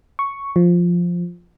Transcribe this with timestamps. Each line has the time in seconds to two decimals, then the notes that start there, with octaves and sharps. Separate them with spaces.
0.19 C#6
0.56 F3